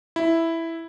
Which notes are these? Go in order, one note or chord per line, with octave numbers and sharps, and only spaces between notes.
E4